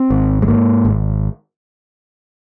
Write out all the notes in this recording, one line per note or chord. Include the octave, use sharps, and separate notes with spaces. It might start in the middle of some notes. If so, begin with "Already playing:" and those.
Already playing: C4
G#1
G#3
G#2 A#3
G#1